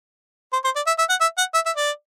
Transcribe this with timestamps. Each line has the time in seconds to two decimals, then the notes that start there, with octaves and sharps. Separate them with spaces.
0.53 C5
0.64 C5
0.76 D5
0.87 E5
0.98 E5
1.09 F#5
1.21 E5
1.38 F#5
1.54 E5
1.66 E5
1.77 D5